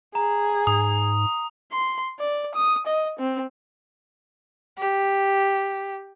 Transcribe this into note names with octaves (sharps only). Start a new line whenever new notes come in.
G#4 A#5
G#2 D#6
C6
D5
D#6
D#5
C4
G4